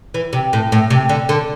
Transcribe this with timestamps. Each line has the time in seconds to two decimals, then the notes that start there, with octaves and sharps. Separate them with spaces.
0.14 E3
0.33 C3
0.53 A2
0.72 A2
0.90 C3
1.09 D3
1.29 D3